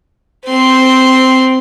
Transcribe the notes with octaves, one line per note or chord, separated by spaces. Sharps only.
C4 C6